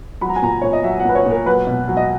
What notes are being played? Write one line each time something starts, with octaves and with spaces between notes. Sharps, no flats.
F#3 B5
A#5
G#5
A#2 A#5
A#2 C#5
D#5
F#3 E5
F#5
A#2 B4
C#5
A#2 A#4
F#3 B4
B2
F#3
D#5